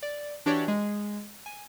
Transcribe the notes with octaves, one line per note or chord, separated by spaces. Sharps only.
D5
E3 D4 F#4 G4 C#5 D5
G#3
G#5